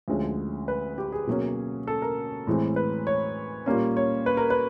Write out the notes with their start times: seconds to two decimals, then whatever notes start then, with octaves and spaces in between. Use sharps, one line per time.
0.08 D2 D3 F3 G#3 C#4
0.68 B4
0.98 G4
1.12 G#4
1.27 B2 F#3 A#3 C#4
1.87 A4
2.02 A#4
2.47 A2 E3 G#3 C4
2.76 B4
3.07 C#5
3.66 A#2 G3 A#3 C#4
3.97 C#5
4.26 B4
4.37 A#4
4.50 B4